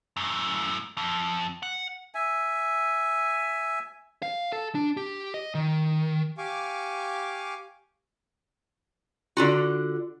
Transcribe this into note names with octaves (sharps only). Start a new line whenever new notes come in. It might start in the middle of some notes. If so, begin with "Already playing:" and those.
F#2 A2
F2
F#5
E5 G#5
F5
A4
D4
G4
D#5
D#3
G4 F5 G#5 C#6 D6
D3 F4 F#4